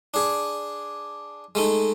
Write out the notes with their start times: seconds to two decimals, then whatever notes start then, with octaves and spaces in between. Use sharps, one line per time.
0.14 D4 G#4
1.55 G#3 A3 D#4